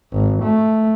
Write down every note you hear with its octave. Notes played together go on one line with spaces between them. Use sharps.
G#1
A3